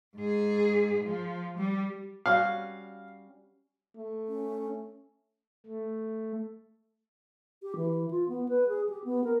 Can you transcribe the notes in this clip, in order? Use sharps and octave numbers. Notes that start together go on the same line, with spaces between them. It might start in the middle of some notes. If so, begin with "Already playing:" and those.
G#2 G#4
F3
G3
G3 C#4 F#4 F5
A3
C#4
A3
G4
E3
F4
B3
B4
G#4
G4
B3
A#4